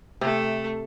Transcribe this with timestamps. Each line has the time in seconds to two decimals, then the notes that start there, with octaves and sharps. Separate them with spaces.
0.21 C3 A3 A4